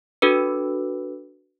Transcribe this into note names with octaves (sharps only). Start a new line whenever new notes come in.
D4 F#4 A4 B4